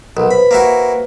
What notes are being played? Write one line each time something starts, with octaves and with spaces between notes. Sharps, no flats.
B1 A#4
B4 C5 B5
A#3 E4 F#4